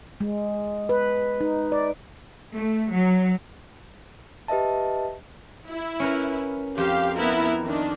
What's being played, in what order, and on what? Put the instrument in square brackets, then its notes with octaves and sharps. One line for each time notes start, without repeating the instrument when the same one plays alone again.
[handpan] G#3
B4
D#4
D5
[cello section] A3
F#3
[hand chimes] G4 B4 D#5 E5 A5
[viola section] E4
[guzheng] C#4 A#4 B4
[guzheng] F2 [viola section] G4 F5
[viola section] B3 E4 A#4
D#3 D4